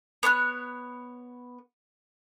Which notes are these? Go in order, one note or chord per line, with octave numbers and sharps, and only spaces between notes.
B3 C#5 C#6 F#6